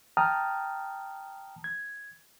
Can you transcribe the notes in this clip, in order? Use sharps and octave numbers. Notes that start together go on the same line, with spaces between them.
G5 A5 A#5 D#6 F6
G#6